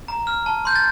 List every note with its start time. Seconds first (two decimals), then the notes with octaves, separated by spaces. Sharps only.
0.08 A#5
0.27 F6
0.46 A5
0.65 C6 G6
0.76 A6